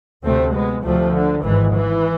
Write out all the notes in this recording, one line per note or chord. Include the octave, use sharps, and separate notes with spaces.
D2 C3 A3 C4
G#3 B3
D2 C3 F3 A3
D3
G#1 G#2 E3
E3